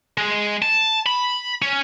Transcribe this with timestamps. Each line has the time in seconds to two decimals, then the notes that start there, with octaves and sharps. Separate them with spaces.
0.17 G#3
0.62 A5
1.06 B5
1.62 C#4